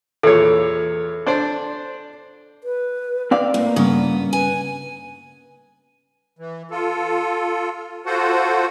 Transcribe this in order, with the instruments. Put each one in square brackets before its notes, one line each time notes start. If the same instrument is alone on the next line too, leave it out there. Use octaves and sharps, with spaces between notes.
[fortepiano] E2 A#2 C#5 [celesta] A4
[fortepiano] D4 C5 D5
[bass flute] B4
[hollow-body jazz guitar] C4 D5 F5
[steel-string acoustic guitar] A2 [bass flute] A#3
[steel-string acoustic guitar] G2 B3 [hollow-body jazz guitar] C#3
[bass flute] B4 [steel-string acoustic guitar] G#5
[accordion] E3
F4 A4
F4 F#4 A4 C5 F#5